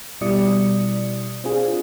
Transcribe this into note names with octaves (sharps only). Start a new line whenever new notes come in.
B2 G3 E4 D5 D#6 C#7
C4 D4 F4 G#4